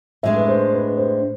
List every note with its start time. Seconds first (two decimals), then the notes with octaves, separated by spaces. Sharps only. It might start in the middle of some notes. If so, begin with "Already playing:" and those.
0.23 A2 G#3 D4 E5
0.36 B4
0.48 C5
0.73 B4
0.97 C5